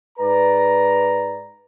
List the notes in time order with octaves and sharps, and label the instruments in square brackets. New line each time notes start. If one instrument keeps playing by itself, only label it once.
[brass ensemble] G#2 B4 D5 A#5